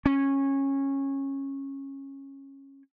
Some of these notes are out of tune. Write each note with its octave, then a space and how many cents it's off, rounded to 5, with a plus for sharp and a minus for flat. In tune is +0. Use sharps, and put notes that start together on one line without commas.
C#4 -15